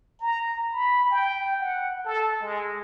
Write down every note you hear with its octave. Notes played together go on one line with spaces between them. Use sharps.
A#5
B5
G5
F#5
A4
G#3